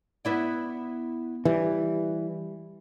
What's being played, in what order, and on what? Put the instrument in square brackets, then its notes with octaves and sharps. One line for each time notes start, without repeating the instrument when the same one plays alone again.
[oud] B3 E4 D5
[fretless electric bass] E3 [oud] G3